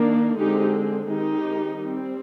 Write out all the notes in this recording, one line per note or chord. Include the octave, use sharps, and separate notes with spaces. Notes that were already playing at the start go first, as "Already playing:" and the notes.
Already playing: D#3 A#3 D4
D3 G#3 C4 D#4 G4
D#3 G#3 C4 D#4 G4
G3 C4